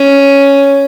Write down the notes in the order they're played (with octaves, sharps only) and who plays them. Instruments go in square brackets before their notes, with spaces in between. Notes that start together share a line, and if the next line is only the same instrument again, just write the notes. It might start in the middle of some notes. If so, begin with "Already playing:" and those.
Already playing: [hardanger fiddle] C#4